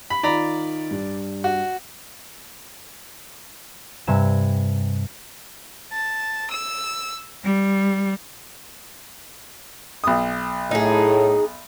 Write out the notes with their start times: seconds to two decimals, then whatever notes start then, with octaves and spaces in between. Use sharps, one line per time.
0.10 B5
0.23 D#3 F4 D5 A#5 B5
0.91 G2
1.44 F#4
4.07 G2 C3 G#5 E7
5.92 A5
6.51 E6
7.43 G3
10.04 B1 D#6
10.71 A2 D#4 G#4